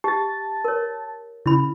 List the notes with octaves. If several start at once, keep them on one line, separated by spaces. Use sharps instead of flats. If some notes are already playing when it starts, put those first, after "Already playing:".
G4 A5 A6
A#4 C#5
C#3 E4 B5